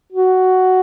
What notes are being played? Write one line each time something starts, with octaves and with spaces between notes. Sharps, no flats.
F#4